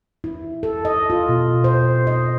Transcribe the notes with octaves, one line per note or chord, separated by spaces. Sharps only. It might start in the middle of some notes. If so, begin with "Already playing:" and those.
E4
A4
D#5
F4
B2
C5
D#5